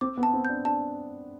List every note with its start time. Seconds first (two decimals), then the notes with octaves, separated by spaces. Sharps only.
0.01 C4 D6
0.17 B3
0.23 A5
0.34 C4
0.45 D4 G6
0.65 D4 A5